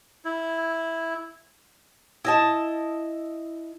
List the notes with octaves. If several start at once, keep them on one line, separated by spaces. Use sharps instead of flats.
E4
E4 D#5 A5